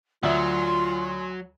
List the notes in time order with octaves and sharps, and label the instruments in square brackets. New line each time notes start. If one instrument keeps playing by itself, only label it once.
[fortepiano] D2 D5 E5 [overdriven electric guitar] F#3 [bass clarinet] F4 [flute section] G#5 C6